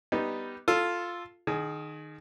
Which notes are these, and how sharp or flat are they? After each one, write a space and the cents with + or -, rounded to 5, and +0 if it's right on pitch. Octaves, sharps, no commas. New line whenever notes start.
G3 +0 B3 +0 D#4 +0
F4 +0 A4 +0
D#3 -20 G#4 +20